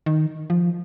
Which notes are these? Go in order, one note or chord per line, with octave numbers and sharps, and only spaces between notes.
D#3
F3